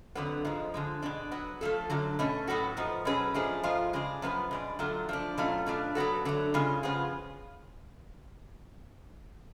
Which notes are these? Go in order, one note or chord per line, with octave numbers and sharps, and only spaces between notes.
F2 D3 F#3 B3
G#2 F3 G#3
D3 F3 G#3
B2 G#3 D4
F#3 B3 F#4
F3 A3 F4 A4
F#2 D3 F#3
B2 A3 C#4
A2 F#3 B3 F#4 A4
G#2 F3 B3
B2 F#3 C#4 G#4 B4
G#2 F3 A3 D4 G#4
G#2 F3 G#3 F4
C#3 G#3 D4 G#4
F#2 F3 B3 F4 B4
B2 G#3 D4
D3 F#3 A3 F4
F3 A3 D4
B2 F#3 A3 C#4 F4
B2 A3 D4 F4
F#3 B3 F#4 A4
D3 F#3 A3
C#3 G#3 C#4 F4
C#3 F3 B3 F4 G#4